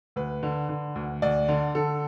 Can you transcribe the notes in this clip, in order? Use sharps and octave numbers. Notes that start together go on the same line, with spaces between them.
D2 B4
D3
D3
D2
D2 D5
D3
D3 A4